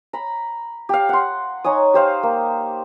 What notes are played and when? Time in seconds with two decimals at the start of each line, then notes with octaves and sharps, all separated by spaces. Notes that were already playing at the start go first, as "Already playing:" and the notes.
0.13 A#5 B5
0.89 G4 F5
1.09 F#5 C6
1.64 D#4 C#5 G#5 D#6
1.94 G4 C5 F5
2.23 A#3